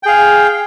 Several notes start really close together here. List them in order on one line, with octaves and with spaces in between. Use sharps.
G5 G#4 F5